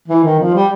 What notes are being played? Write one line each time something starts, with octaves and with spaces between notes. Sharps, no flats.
E3
D#3
F3
G3